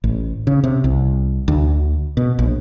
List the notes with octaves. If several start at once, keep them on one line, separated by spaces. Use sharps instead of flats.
A1
C#3
C3
C2
D2
B2
A#1